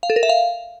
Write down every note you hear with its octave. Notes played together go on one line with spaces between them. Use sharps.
F5
A4
A#4
E5
F5